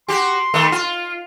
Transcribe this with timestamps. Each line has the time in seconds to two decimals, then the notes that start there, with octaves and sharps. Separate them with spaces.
0.08 F#4 G4 C6
0.54 D#3 A3
0.72 F4